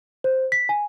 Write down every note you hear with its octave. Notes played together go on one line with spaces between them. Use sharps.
C5
B6
G#5